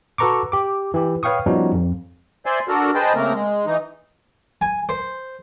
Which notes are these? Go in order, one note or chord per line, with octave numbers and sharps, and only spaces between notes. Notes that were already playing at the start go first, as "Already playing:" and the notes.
F#4 A4 B4 A#5 C#6 D6
G4 D6
E3 G4
B4 C#5 F5 G5 C#6 D#6
F3 G3 B3 C#4 D#4 F#4
F2
C5 D5 E5 G#5 C6
D4 F#4 A4 A#4
G#4 B4 C5 D#5 G5 A5
C#3 A3 A#3 C4 A#4
G#3
E3 D#4
G#5
C5